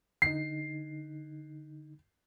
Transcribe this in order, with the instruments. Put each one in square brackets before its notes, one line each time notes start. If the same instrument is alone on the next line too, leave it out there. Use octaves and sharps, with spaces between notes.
[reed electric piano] D3 D#4 [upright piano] C7